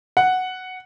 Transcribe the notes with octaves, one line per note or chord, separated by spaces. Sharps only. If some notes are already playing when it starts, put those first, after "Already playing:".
F#5